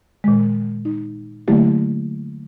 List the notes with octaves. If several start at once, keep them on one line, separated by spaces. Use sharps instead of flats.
A#2 D#3 G#3
D#4
D3 F#3 A3 A#3 E4 G4